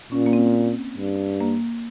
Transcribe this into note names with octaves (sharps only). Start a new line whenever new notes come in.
A#2 C#4
A#3
C4
G2
A#3